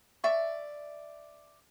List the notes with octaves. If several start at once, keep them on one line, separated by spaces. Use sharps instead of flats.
D5 E5 C#6